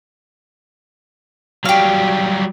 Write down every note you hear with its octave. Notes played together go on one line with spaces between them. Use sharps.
F#3 G3 G4 F5